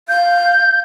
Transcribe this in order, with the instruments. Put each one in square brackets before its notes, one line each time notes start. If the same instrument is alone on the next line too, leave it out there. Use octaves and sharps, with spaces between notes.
[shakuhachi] F5 [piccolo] G6